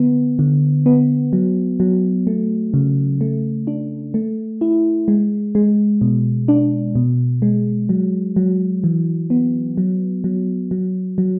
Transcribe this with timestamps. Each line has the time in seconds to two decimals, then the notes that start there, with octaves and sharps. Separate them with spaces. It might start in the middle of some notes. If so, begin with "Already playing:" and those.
Already playing: D3 B3
0.39 D3
0.86 B3
1.33 F#3
1.80 F#3
2.27 A3
2.74 C#3
3.21 A3
3.67 D4
4.14 A3
4.61 E4
5.08 G#3
5.55 G#3
6.01 B2
6.48 D4
6.95 B2
7.42 G#3
7.89 F#3
8.36 F#3
8.84 E3
9.30 B3
9.77 F#3
10.24 F#3
10.71 F#3
11.18 F#3